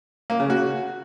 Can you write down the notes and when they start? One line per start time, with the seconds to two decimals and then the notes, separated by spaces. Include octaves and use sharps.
0.30 A#3
0.40 C#3
0.50 F#4